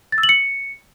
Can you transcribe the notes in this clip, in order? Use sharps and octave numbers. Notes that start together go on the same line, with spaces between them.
A6
E6
F#7
C#7